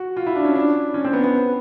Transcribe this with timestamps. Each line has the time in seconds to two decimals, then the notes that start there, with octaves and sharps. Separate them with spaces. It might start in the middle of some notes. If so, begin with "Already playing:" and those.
Already playing: F#4
0.17 F4
0.27 E4
0.35 D4
0.45 C#4
0.55 D4
0.94 C#4
1.04 C4
1.13 B3
1.24 B3